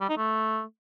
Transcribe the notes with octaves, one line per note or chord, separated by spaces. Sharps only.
G3
D#4
A3